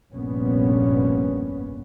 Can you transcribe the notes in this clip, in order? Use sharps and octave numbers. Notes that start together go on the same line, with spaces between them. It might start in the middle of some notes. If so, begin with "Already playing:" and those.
F1 A#1 G2 A#2 B3 C#4